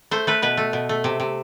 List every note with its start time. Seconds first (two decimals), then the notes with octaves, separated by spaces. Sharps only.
0.11 A3 C5
0.27 A3 B4
0.42 B2 B4
0.57 A3
0.73 B2
0.89 A3
1.04 C3
1.20 C3